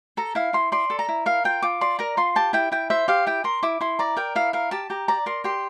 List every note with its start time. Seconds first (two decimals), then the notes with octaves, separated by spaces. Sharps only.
0.17 A4 A#5
0.35 E4 F5
0.53 E4 C6
0.72 D5 C6
0.90 A4
0.99 A#5
1.08 E4
1.26 A#4 F5
1.44 F4 G5
1.62 F4 D6
1.81 D5 C6
1.99 A#4 A#5
2.17 F4 C6
2.36 G4 A5
2.53 E4 G5
2.72 E4 G5
2.90 C5 E5
3.08 G4 F5
3.27 E4 G5
3.44 A#4 C6
3.63 E4 D6
3.81 E4 C6
3.99 D5 A#5
4.17 A#4 G5
4.35 E4 F5
4.53 A#4 F5
4.71 G4 A5
4.90 G4 A#5
5.08 D5 A#5
5.26 A#4 C6
5.44 G4 C6